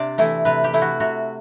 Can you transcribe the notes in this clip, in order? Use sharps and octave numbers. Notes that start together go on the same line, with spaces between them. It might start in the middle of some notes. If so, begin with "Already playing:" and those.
Already playing: C3 D4 C5 D5
E3 A3 E4
C3 B4
G4
E3 A3 E4
F#4
C3 F#4